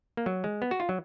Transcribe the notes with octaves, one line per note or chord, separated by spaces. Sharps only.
A#3
F#3
G#3
B3
F#4
F4
F#3